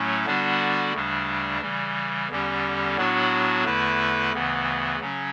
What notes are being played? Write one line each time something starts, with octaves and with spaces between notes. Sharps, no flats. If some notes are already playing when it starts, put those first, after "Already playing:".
Already playing: A2 F#3 A3 C#4
D3 G3 B3 D4 F#4
D2 C#3 G3 D4
C#3 E3 G3
E2 D3 G3 C#4 G4
A2 F#3 B3 D4 F#4
E2 D3 A3 E4 B4
D2 C#3 E3 B3
C#3 F#3 C#4